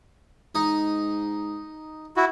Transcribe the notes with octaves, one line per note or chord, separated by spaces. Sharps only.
G#2 D#4
E4 F#4